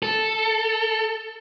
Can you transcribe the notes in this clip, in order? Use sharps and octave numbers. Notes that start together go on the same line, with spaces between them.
A4